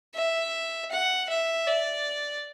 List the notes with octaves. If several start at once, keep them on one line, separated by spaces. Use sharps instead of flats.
E5
F#5
E5
D5